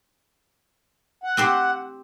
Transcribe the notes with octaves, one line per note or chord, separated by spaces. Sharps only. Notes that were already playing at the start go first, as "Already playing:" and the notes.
F#5
C4 G4 C5